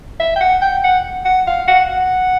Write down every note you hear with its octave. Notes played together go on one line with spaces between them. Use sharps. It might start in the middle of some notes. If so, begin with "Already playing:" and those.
E5
G5
F#5
G5
F#5
F#5
F5
F#5
F#5